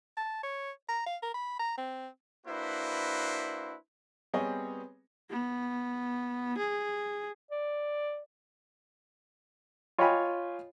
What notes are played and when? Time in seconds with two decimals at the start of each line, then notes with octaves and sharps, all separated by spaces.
0.17 A5
0.43 C#5
0.89 A#5
1.06 F5
1.23 A#4
1.34 B5
1.59 A#5
1.78 C4
2.47 A#3 D4 E4 F#4 B4 C5
4.33 G3 B3 C4 G#4 C#5 D#5
5.31 B3
6.58 G#4
7.51 D5
9.98 F4 C#5 D#5 G5 G#5 B5